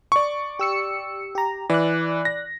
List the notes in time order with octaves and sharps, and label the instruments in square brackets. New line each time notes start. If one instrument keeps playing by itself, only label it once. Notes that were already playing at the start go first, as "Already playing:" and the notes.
[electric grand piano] D5 C#6
[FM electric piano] G4 E6 C#7
G4 A#5
[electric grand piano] E3 [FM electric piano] D5 F#6
[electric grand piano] A#6